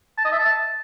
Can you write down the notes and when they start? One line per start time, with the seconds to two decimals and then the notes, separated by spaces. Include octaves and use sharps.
0.18 A5
0.25 D#5
0.32 E5
0.39 A5